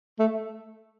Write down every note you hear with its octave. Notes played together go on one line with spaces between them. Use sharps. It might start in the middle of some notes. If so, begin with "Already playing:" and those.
A3